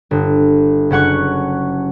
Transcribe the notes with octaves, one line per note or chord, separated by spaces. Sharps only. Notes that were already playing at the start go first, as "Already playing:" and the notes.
G1
F#1 C#4 F#5 C#6